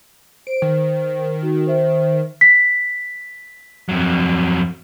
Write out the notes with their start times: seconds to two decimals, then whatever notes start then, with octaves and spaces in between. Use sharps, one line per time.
0.47 C5 D7
0.62 D#3
1.43 D#4 F#4
1.67 C5 E5
2.41 B6
3.89 F2 F#3